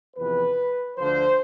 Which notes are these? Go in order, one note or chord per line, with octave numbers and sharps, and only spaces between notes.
E2 C3 F3 B4
D2 D3 F3 C5